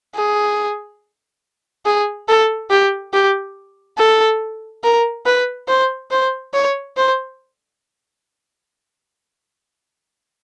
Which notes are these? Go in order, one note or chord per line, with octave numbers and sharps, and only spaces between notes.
G#4
G#4
A4
G4
G4
A4
A#4
B4
C5
C5
C#5
C5